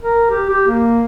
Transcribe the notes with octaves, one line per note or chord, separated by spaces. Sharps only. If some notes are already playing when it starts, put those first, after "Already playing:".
A#4
G4
G4
A#3